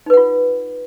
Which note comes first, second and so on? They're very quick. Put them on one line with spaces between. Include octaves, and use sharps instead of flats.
D#4 B4 F#5 F4